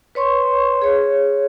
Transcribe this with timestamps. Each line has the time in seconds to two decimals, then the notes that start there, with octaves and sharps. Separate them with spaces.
0.15 B4 C#5 C6 C#6
0.82 G#4 C#5